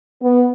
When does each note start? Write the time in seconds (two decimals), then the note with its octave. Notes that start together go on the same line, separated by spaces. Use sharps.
0.22 B3